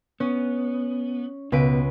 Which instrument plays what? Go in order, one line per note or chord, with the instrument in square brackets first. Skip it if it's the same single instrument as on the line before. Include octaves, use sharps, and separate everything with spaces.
[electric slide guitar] B3 [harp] C#4
[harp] C#2 B4 D7 [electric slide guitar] B2